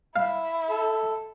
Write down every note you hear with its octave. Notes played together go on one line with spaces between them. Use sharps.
E4 F5
A4